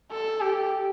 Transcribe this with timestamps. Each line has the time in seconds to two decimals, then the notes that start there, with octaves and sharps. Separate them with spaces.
0.11 A4
0.41 G4